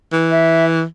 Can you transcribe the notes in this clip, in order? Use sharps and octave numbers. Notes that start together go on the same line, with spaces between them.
E3
E5